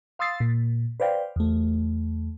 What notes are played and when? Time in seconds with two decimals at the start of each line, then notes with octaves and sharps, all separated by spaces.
0.19 F5 C6 D#6 E6 A6 C7
0.40 A#2
1.00 B4 C5 D5 F5 G5
1.36 E2 A3